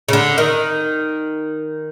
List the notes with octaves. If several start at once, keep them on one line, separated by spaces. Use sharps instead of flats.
C#3
D3
D#3